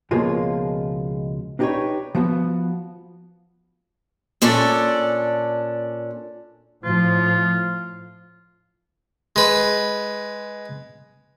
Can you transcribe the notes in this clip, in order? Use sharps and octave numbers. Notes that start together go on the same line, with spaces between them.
C#2 B2 F3 G#3 A#3 F4
D4 D#4 G4 G#4 B4 C#5
F3 B3 F#4
A#2 C#4 D4 A4
A2 F3 F4
G#3 B4